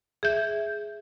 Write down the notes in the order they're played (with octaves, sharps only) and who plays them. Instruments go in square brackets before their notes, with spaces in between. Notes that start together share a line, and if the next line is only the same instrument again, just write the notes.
[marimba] G#4 E5 G6